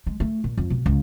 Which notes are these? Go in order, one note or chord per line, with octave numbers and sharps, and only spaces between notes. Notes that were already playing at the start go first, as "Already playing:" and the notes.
G#3
A3
A#2
F2
B2
C#2